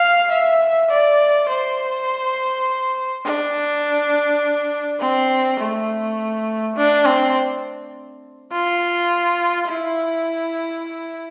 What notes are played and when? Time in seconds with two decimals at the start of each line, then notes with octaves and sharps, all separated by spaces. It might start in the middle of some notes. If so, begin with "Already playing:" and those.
Already playing: F5
0.31 E5
0.90 D5
1.49 C5
3.25 D4
5.00 C4
5.59 A3
6.76 D4
7.05 C4
8.52 F4
9.69 E4